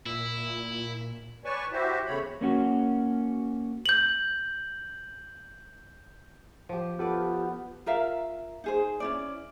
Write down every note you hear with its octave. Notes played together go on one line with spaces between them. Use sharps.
A#2 E4
B4 C#5 D5 G#5 A5 C#6
E4 F#4 G4 C5 E5
E2 C#3 A3 C#5 B5
A#3 C#4 F#4
G6 F#7
F3 G4
B3 F4 G4 A4 B4 D5
F4 A#4 E5 F5
D#4 G#4 C5
C#4 E4 D5